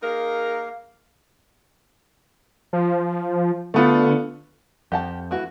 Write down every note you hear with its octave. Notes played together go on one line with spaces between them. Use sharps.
A#3 D#4 G#4 A#4 F5
F3
D3 A3 B3 F4
F2 G4 F#5 A5
E3 A3 F#4